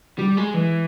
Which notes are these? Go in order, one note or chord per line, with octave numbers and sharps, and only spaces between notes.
G3
G#3
E3